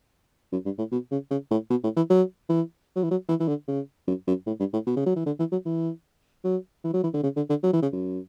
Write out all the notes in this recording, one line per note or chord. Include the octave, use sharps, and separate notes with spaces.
F#2
G2
A2
B2
C#3
C#3
A2
B2
A2
E3
F#3
E3
F#3
E3
F#3
E3
E3
D3
C#3
F#2
F#2
A2
G2
A2
B2
C#3
F#3
E3
D3
E3
F#3
E3
F#3
E3
F#3
E3
D3
C#3
D3
D3
F#3
E3
C#3
F#2